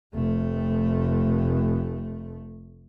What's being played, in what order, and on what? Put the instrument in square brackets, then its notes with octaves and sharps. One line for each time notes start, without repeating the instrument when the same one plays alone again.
[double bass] F1 A3